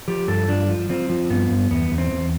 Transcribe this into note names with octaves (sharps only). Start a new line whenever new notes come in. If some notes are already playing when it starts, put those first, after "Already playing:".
F3 G4
G2 A4
F3 D4
F3
F3 C4
F3
G2 B3
G2
E2 B3
E2
C4
E2